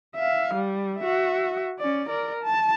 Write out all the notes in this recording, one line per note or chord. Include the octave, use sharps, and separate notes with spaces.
E5 F5
G3
F#4 E5
C#4 D5
A#4 D5
A5